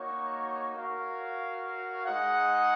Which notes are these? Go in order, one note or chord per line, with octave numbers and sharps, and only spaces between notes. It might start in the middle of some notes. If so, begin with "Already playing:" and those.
Already playing: A#3 D#4 F#4 C#5
F#4 A#4 C#5 F5
G#3 D#4 G#4 D#5 F#5